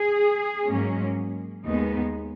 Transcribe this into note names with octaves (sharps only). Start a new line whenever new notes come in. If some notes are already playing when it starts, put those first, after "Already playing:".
Already playing: G#4
G#2 F#3 A#3 C#4
D#2 D#3 G#3 B3 D#4